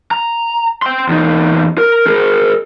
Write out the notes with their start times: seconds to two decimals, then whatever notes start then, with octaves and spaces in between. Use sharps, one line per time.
0.11 A#5
0.82 G5 C6
1.08 E2 D#4
1.78 A#4
2.07 G#4 A#4